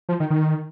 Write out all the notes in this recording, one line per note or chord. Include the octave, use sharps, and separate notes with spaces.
F3
D#3
D#3